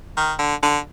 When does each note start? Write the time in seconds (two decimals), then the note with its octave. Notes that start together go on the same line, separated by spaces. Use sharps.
0.17 D#3
0.39 D3
0.63 D3